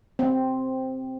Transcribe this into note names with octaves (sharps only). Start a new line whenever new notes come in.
C4